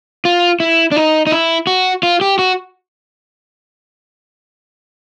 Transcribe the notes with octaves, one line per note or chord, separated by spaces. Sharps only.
F4
E4
D4
D#4
D#4
E4
F#4
F4
G4
F#4